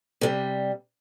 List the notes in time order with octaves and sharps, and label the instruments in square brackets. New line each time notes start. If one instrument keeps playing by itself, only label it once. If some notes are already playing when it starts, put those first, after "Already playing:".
[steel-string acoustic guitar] C3 G3